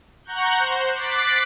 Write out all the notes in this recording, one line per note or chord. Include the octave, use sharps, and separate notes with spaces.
F#5 A#5 C#6 F#6 G6
C5
D6 F#6 A6 B6 C7